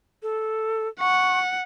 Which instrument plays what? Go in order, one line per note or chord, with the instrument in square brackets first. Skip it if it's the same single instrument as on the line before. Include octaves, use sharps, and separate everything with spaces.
[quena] A4
[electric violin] F#5 [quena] C#6